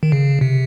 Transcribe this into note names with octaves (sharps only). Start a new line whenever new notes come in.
D#3
C#3
C3